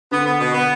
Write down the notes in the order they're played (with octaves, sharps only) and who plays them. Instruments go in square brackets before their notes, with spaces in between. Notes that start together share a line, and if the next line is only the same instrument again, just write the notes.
[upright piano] D3 [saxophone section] B3
[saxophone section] B3
B2
B3